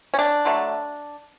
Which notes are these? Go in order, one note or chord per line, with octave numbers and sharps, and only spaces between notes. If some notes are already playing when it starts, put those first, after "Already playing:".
C#4
D4
D3 F#3 A3